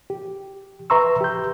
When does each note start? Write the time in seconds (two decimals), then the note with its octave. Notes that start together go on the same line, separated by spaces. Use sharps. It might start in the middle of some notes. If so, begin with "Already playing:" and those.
0.10 G4
0.90 B4 E5 A#5 C6 C#6 E6
1.21 G4 G6